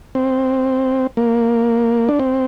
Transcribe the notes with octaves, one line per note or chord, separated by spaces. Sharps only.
C4
A#3
D4
C4